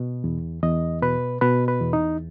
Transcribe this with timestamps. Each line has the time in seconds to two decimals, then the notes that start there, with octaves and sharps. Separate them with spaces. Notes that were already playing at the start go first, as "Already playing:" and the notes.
Already playing: B2
0.24 E2
0.63 E2 D#5
1.02 B2 B4
1.41 B2 B4
1.68 B4
1.81 E2
1.93 D#4